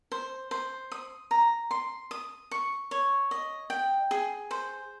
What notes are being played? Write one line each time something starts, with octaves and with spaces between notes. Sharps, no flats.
C5
C5
D#6
A#5
C6
D#6
C#6
C#5
D#5
G5
G#4
C5